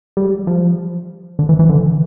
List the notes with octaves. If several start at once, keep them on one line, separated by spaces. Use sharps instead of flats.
G3
F3
D3
E3
E3
D3